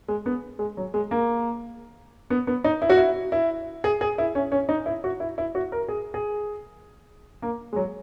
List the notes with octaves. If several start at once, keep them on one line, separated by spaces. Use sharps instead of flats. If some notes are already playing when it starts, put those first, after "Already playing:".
G#3
B3
G#3
F#3
G#3
A#3
B3
B3
D#4
E4
F#4
E4
E4
G#4
G#4
E4
C#4
C#4
D#4
E4
F#4
E4
E4
F#4
A#4
G#4
G#4
A#3
G#3
F#3